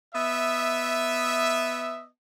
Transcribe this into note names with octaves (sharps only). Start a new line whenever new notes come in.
B3 D#5 E5